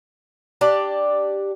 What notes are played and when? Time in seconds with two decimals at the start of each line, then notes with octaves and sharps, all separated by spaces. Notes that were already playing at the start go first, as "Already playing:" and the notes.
0.61 D4 G4 D5